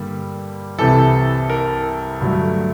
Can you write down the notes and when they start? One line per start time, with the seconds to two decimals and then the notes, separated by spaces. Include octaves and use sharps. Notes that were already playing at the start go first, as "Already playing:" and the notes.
Already playing: G2 D3 G3 A#3
0.78 C2 C3 E3 A4
1.50 A#4
2.21 G2 D3 F#3 A3